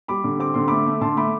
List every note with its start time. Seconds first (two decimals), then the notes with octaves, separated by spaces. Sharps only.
0.08 G3 B5 D6
0.24 D3
0.40 C4 D6
0.54 D3 C6
0.68 A3 B5 D6
0.86 A3
1.01 D3 A5 C6
1.17 A3 B5 D6